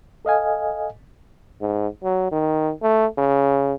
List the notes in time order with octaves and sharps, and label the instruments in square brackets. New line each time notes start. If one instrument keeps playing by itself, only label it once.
[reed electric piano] A4 D#5 F5 G#5
[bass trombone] G#2
F#3
D#3
A3
C#3